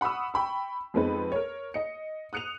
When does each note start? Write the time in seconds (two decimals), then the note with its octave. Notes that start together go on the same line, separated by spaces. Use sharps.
0.01 F#5 B5 C#6 D#6 E6
0.34 G5 B5 C#6
0.94 F2 G#3 B3 C4 D#4 B4
1.32 A#4 C#5
1.74 D#5 C#7
2.33 D#6 F#6 C#7 D#7 F7